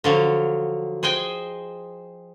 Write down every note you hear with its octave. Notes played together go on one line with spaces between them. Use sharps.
D3 F3 F#3
G#4 C5 D#5 G5 G#5